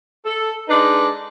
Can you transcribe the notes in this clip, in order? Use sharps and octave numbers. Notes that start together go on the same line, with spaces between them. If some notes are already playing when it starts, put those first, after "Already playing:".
A4
G#3 D4 D#4 B4